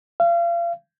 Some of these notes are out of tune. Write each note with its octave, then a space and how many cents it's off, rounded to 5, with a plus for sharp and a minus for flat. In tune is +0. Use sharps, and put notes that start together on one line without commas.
F5 -35